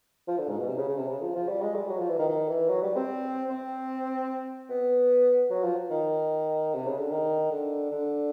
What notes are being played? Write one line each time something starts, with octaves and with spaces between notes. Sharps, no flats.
F3
D3
G#2
B2
C3
C#3
C#3
C3
C#3
F3
F3
G3
G#3
G3
F#3
F3
E3
D#3
D#3
E3
F#3
G3
C4
C4
B3
F#3
F3
D#3
C3
C#3
D3
D#3
D3
D3